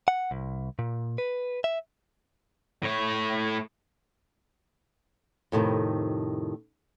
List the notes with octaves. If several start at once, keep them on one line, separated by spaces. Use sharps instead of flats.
F#5
C2
A#2
B4
E5
A2 C#5
F2 A2 C3 D#3